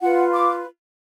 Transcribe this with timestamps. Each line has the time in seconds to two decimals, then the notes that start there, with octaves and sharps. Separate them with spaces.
0.01 F4 B4 F#5
0.32 D6